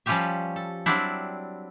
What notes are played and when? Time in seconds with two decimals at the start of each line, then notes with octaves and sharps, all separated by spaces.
0.06 F3 G3 C#4 F4 G4 E5
0.56 A4
0.86 F#3 G3 C4 D4 E4